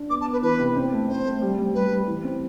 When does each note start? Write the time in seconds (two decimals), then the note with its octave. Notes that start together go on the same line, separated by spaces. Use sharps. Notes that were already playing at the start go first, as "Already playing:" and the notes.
Already playing: D4
0.10 B3 D6
0.21 A5
0.26 B3
0.32 B4
0.42 E3 B4
0.59 C3
0.76 C4
0.92 A3
1.09 C4 C5
1.26 A3
1.42 G3
1.58 G3
1.74 G3 B4
1.91 G3
2.07 E3
2.24 C4